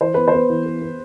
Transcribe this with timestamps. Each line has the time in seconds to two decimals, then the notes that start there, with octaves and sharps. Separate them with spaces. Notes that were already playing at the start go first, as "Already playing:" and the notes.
0.01 E3 C5
0.14 B3 B4
0.28 C5
0.34 B3
0.50 E3
0.66 B3
0.81 B3